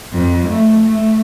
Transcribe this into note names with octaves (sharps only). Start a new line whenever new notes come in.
F2
A3
A3